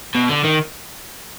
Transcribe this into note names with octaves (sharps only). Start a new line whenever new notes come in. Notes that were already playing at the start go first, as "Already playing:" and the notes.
B2
D3
D#3